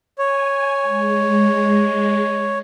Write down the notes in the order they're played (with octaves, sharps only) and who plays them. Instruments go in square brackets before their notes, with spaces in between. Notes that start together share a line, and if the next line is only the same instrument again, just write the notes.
[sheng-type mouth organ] C#5 [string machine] G#5
[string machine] G#3